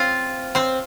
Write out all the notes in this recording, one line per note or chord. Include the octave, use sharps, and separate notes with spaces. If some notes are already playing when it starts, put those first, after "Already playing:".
Already playing: C4 F4 C5 F5
C4 C5